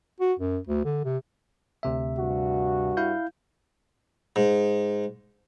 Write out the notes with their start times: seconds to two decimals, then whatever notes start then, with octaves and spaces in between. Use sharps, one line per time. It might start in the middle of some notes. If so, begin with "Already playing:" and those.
0.21 F#4
0.40 F#2
0.67 D2
0.85 D3
1.05 C3
1.83 D2 C3 E5
2.17 G2 F#4
2.97 E4 F5 G6
4.36 G#2